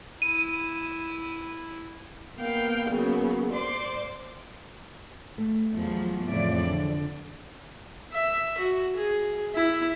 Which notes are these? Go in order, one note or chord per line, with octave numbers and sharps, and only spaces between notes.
E4 D#7
A#3 B3 F5 G5
C#3 F#3 A#3 B3
C5 D5 C6 D6
A3
E2 F3 F#3
F2 A2 C#3 E3 D5 E5
D3
E5
F#4
G#4
E4